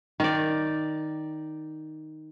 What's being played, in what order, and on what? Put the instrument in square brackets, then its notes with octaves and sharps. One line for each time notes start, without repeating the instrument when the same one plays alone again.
[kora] D#3 D5